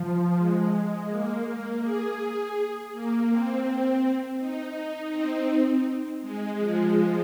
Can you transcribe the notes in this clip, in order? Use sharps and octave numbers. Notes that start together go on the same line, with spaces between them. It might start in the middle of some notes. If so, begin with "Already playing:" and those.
Already playing: F3
G#3
A#3
G#4
A#3
C4
D#4
D#4
C4
G#3
F3